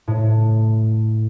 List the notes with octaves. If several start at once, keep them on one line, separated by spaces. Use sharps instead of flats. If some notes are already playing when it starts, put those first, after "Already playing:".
A2